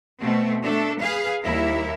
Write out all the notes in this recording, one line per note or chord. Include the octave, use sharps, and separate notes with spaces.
B2 A3 C4
A3 D4 A4
G#4 B4 F5
D#2 G3 E4 A#4 E5